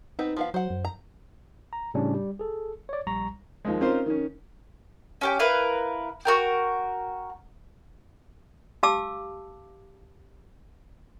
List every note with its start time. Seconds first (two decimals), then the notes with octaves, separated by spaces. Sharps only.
0.19 B3 C4 D#4 B4
0.37 F3 B3 F5
0.54 F#3 C5 F#5
0.70 F#2
0.85 A#5
1.73 A#5
1.94 A2 C#3 G3 C#4 D4
2.14 G3
2.39 G#4 A4
2.89 C#5 D5
3.07 A#1 G3 A#5 C#6
3.65 D#2 F3 G#3
3.81 C4 C#4 D#4 F4 A#4 C5
4.06 D#3 C#4
5.21 C#4 G4 G5
5.39 E4 A#4 B4 F5
6.25 F#4 A#4 G5
8.83 G4 F5 A5 D6 E6